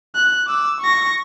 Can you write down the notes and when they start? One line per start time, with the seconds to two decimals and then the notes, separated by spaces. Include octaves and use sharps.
0.15 F#6
0.47 D6 E6
0.80 C#6 A#6